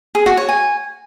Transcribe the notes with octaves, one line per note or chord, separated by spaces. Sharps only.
G#4
F#4
C#5
G#5